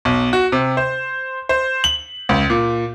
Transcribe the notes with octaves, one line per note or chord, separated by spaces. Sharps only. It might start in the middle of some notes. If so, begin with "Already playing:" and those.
B1
F#4
C3
C5
C5
F#7
C#2
A#2